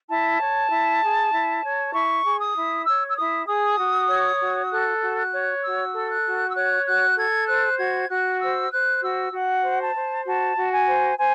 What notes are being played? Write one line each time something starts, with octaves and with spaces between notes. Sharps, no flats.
E4 A5
C#5
E4
G#4
E4
C#5
E4 C#6
G#4
D#6
E4
C#5 E6
E6
E4 D#6
G#4 D#6
F#4
C#5
F#4
A4 F#6
F#4
F#6
C#5
F#4 E6
A4
F#6
F#4
E6
C#5 F#6
F#4 F#6
A4 G#6
C5 F#6
F#4 G#6
F#4 F#6
C5 E6
C5 F#6
F#4 E6
F#4 F#5
C5
A5
C5
F#4 A5
F#4
G#5
C5
C5 G#5